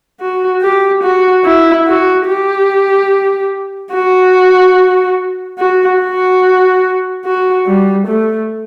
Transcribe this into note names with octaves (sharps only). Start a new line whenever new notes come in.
F#4
G4
F#4
E4
F#4
G4
F#4
F#4
F#4
F#4
G3
A3